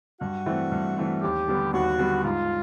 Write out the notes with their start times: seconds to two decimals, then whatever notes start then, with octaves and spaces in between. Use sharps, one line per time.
0.21 G2 F#4
0.46 E3 A3 C4
0.72 G2
0.98 E3 A3 C4
1.22 D#2 G4
1.48 D3 G3 B3
1.73 D#2 F#4
1.99 D3 G3 B3
2.24 G#2 F4